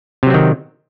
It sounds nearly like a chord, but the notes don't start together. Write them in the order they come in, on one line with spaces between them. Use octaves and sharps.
C3 F#3 C4 D#3